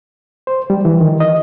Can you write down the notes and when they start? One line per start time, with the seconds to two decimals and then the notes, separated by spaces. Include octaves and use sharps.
0.47 C5
0.70 G3
0.85 E3
1.01 D#3
1.20 D#5